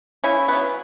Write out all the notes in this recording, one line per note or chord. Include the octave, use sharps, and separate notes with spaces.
C#3 C#4 E4
F#3 B3